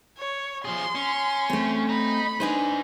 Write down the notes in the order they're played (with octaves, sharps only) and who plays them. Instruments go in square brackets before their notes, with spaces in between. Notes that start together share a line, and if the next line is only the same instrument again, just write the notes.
[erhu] C#5
[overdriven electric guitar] F3 G#4 [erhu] C6
[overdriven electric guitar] C#4
[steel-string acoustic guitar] A3 C4
[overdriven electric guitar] D#5 A#5 [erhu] B5
[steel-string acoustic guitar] D4 D#4 B4 [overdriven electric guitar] C5 G#5